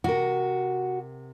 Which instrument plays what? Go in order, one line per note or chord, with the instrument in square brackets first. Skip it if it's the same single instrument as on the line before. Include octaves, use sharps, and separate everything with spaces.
[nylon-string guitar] C3 A#4 [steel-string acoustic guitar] F#4